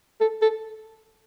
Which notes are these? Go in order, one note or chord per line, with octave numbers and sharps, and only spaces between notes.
A4
A4